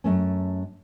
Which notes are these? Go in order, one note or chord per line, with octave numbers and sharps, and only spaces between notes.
F#2 A3 C#4